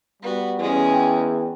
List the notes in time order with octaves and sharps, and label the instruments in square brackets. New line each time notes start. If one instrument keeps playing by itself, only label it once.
[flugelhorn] G3 [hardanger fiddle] B3 F#4
[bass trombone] E2 [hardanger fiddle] G#3 C#4
[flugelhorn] G5